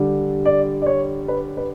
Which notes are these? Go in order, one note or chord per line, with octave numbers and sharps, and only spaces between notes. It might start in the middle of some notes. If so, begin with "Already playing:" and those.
Already playing: D3 G3
D5
D5
C#5
B4
B4